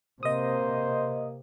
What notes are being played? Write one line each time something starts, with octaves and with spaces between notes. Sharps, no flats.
C3 A#3 C5 D#5 D#6